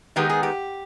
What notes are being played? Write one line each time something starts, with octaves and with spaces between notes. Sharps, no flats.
D#3 G#3 B3 D#4 G4
G#4
G4